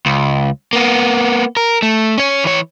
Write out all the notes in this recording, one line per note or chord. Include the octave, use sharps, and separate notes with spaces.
C#2
A#3 B3
A#4
A3
C#4 C#5
E3 C#5